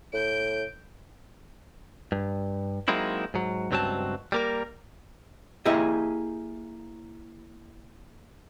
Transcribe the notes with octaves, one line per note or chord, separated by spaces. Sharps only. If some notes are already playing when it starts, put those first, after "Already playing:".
A2 G6 D7
G2
F#3 G#3 A#3 C4 D#4 E4
G#2 F#3
C#2 G2 F#3 C4 F#4 A5
G3 A#3 A#4
A#3 E4 G4 G#4 D#5